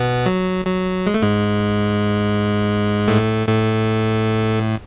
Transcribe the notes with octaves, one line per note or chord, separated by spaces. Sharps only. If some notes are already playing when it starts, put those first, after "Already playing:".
Already playing: B2 B3
F#3
F#3
G#3
A3
G#2 G#3
A2 A3
A2 A3